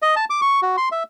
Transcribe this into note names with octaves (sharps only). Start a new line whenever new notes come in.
D#5
A5
D6
C#6
F#4
C6
E5